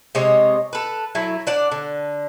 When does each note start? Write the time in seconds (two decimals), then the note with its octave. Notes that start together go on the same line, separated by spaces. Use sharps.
0.15 C3 G#3 C#5 D#5
0.73 A4 B4
1.15 F#3 A3 E4
1.47 D4 D5 F#5
1.71 D3